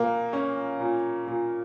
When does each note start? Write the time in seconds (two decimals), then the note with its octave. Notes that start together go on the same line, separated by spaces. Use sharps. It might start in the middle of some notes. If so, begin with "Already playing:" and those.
Already playing: A#2 A#3
0.33 C#4
0.80 A#2
1.28 A#2